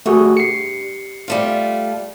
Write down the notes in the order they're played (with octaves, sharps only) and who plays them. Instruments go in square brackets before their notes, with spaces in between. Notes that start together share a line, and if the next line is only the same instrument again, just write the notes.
[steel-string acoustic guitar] G2 [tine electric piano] A3 F#4 G#4
[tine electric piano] C7 C#7
[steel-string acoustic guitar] G3 A3 F4